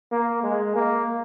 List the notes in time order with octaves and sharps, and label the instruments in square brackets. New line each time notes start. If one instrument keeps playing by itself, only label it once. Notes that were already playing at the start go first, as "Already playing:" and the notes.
[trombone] A#3
G#3
A#3